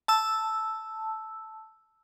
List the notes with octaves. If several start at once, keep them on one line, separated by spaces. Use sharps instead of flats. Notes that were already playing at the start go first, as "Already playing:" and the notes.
A5 E6